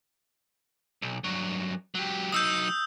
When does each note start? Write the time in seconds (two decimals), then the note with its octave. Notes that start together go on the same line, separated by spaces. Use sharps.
1.02 B1
1.24 G2 F#3
1.95 F#3 G4
2.32 F#3 D#4 D#6 E6 G6